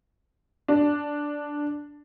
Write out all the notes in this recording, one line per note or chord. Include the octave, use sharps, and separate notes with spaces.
D4